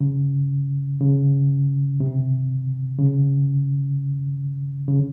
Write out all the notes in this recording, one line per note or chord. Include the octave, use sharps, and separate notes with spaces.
C#3
C#3
C3
C#3
C#3